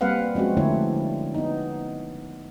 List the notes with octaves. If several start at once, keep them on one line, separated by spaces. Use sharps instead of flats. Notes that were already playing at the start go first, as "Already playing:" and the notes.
G3 A#3 C4 B4 F5 F#5
F3 G#3 C4 C#4 F#4
D3 F3 A3 D4 E4 C#5
B3 D#4